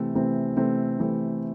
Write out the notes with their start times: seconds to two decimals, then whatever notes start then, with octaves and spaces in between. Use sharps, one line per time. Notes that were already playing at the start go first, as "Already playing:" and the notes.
Already playing: C3 E3 A3 C4
0.15 C3 E3 A3 C4
0.57 C3 E3 A3 C4
0.99 C3 E3 A3 C4